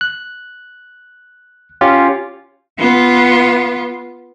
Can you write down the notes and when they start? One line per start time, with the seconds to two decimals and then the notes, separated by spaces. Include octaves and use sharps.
0.01 F#6
1.81 C#4 F4 G4
2.79 B3 F4